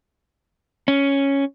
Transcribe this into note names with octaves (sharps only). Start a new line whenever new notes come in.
C#4